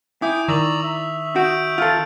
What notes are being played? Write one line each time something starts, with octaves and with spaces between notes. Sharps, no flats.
E4 G5 G#5 D6 D#6
D#3 D5 A#5 C#6 E6 F7 F#7
E5
F#4 D#6 G6 D7
F4 A4